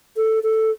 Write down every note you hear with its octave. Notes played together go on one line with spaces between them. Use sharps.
A4
A4